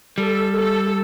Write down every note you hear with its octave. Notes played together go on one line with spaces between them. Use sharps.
G3 A4
A4